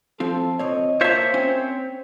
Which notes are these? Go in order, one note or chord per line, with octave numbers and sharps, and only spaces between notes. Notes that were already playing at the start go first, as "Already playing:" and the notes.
F3 C4 F4 A4
C#2 C4 C#5 D#5
A#3 F4 C5 C#5 E5 A5
C4 C#4